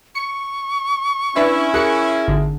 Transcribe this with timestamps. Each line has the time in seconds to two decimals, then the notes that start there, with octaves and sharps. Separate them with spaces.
0.15 C#6 C#7
1.36 C#4 D4 E4 B4 E5
1.74 G#4 A#4 F#6 C#7
2.28 G#1 D3